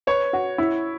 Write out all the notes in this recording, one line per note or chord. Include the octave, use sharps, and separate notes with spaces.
B4 C#5
F#4
E4